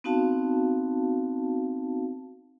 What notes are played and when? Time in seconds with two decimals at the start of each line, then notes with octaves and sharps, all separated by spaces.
0.04 B3 C4 D#4 F#4 F5 A5